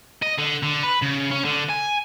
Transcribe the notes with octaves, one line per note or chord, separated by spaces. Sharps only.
D#5
D3
D3
B4
C#3
C#4
D3
G#5